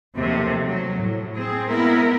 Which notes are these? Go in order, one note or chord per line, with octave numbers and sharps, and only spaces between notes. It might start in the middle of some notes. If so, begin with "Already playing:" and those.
D#2 C3 F3 F#3 A3
F#3
A2
C4 G#4
G#3 A#3 B3 E4 A#4